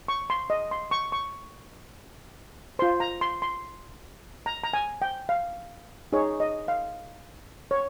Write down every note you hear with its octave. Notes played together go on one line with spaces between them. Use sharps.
C#6
C6
D#5
C6
C#6
C#6
F4 C5 C6
A#5
C6
C6
A#5
A#5
G#5
G5
F5
D#4 G#4 C#5
D#5
F5
C#5